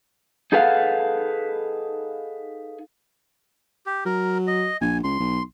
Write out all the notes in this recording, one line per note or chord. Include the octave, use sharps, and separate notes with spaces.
D#4 G#4 A4 B4 F5 F#5
G4
F#3 A#4
D#5
A#1 G#5
C#2 C6
B1